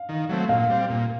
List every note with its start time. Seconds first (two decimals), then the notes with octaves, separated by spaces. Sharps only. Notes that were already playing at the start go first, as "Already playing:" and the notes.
Already playing: F5
0.09 D#3
0.29 F#3 A3 C4
0.49 A#2 F5
0.69 G3 C4
0.90 A#2